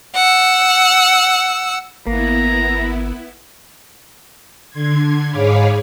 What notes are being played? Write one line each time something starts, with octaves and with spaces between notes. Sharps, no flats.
F#5 E6
G#1 A#3 B3 E4 A#5
D3 C6 G#6
G#2 G#4 C#5 F5 B5 D6